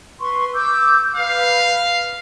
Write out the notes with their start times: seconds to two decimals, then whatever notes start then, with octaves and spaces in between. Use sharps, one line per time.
0.20 B4 C6 C#6
0.54 D6 E6 G6
1.16 B4 F5